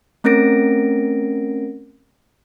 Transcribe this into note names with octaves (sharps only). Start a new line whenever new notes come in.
A3 C4 C#4 A#4 A#6 D7